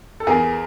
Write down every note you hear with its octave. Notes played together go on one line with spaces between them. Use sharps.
A4
E2 G#4 A#4